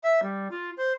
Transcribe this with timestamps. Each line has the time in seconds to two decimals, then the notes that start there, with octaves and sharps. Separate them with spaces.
0.03 E5
0.22 G3
0.51 F4
0.77 C5